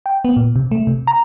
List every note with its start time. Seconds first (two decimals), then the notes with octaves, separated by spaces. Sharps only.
0.06 G5
0.25 B3
0.37 A#2
0.56 C3
0.71 A3
0.87 C3
1.07 A#5